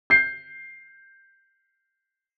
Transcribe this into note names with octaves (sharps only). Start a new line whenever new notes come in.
G6 C7